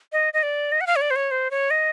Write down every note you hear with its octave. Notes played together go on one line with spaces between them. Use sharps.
D#5
D#5
D5
D#5
F#5
F5
C#5
D5
C5
C#5
C5
C#5
D#5